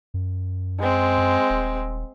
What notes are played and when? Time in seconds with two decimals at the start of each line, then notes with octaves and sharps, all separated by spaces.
0.14 F#2
0.80 G#3 C4
1.18 F#2
1.50 D#1